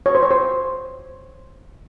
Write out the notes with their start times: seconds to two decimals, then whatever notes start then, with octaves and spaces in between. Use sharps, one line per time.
0.06 C#5
0.15 C5
0.23 C#5
0.31 C5